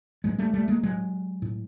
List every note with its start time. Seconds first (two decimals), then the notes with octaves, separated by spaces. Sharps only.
0.24 A2 F#3 G#3
0.39 G3 A3
0.54 G3 A3
0.68 G#3 A#3
0.83 A2 F#3 G#3
1.42 A2